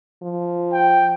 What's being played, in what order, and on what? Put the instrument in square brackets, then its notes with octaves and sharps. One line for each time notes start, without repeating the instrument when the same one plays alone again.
[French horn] F3
[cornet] G5